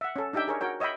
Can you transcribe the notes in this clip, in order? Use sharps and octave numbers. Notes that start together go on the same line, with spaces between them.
E5 F#5
C#4 A4
D4 D#4 G4 E5 G5
G#4 A#4 C#5
F#4 A#4 C#5 G5
C#5 D#5 E5 G5 B5